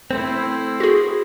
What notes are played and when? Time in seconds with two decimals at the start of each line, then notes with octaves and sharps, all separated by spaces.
0.11 A3 C4 E4 C5
0.80 F#4 G#4